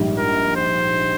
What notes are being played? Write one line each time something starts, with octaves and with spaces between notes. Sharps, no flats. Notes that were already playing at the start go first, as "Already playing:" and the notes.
Already playing: A#1 G#2 G3
A#4
C5